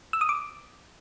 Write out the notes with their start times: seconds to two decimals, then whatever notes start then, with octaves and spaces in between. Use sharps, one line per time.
0.13 E6
0.21 D#6
0.29 D6